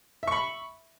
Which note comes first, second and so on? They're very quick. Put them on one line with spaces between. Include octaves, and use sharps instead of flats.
E5 C#6 B5